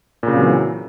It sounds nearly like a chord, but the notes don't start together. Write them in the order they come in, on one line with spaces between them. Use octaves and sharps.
A#2 C#3 C4 F#3 E3